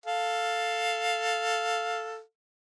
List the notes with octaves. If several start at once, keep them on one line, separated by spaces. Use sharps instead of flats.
A4 F5